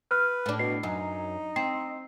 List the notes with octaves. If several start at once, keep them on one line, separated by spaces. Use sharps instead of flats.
B4 F6 F#6
A2 D4
B2 C7
F#2 D#4
C4 C7